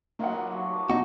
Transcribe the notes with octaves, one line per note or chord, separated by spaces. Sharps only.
F#3 A#3 D#4 F4 F5 F#5
G4 A#4 B4
F3 A3 C#6
B4 D6
B2 D#4 F#4